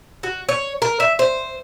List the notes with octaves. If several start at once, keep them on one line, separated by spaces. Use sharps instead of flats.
F#4
C#5
A#4
E5
C5